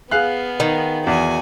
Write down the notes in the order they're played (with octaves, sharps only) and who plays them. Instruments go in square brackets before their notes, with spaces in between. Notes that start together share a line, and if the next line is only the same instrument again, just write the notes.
[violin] B3 [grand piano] G#4 F5 F#6
[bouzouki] D#3
[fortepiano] E2 [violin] F#4 G#5